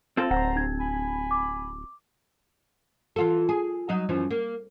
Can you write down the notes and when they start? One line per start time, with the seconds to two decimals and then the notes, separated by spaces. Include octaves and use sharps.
0.17 C4 F4 A4
0.31 D1 C5 F#5 A#5
0.56 D4 G#6
0.80 G#5 B5
1.31 D6
3.16 E3 F4 A4
3.49 G#4
3.89 F#3 D#4 D#5
4.09 F#2 E3 F3
4.31 A#3